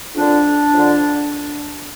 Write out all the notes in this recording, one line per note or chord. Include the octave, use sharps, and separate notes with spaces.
F2 D3 D4
F2 D3